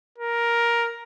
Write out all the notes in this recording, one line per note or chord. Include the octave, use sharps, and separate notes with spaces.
A#4